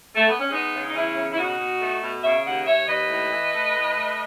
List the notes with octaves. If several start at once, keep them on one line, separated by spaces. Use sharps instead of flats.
A3
B3
C#4
G#3 B3 D#4
C#3
D#4
E2 C#4 E4
C#3
E4
B2 D#4 F#4
B2
A3
B2
C#3 C#5 E5
D#2 D#5 F#5
D#2 C#5 E5
D#2 B4 D#5
A2
E3
A3
A2
A3